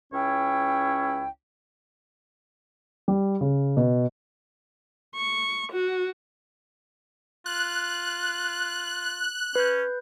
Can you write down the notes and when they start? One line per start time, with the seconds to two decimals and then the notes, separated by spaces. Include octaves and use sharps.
0.13 C#2 C#4 E4 C#5 G5
3.08 G3
3.41 C#3
3.77 B2
5.15 C#6
5.72 F#4
7.46 F4 F#6
9.56 C#4 B4 G6